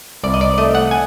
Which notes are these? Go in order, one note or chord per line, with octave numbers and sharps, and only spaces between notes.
C2 D5
D#5
D5
A3 D#5
F#5
G#5